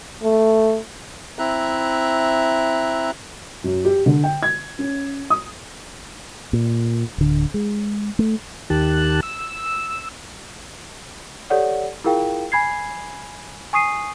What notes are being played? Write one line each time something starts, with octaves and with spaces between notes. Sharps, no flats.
A3
C4 E4 E5 A#5 F#6
F#2
G4
D3
G5
G#6
C#4
D#6
A#2
D1 D3
G#3
A3
D#2 D#3 G4 A5 F#6
E6
G4 A4 C#5 D5 F#5
E4 F4 G#4 A#4 F5 G5
G#5 B5 G#6 C7
G#5 C#6 D#6 C7 D#7